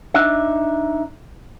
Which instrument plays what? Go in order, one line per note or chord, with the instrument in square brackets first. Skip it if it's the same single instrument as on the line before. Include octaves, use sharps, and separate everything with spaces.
[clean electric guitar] D4 D#4 E5